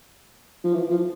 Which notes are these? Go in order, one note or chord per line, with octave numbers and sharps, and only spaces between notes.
F3
E3
F3